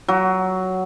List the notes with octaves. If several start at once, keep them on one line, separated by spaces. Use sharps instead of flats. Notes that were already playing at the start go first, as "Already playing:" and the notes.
F#3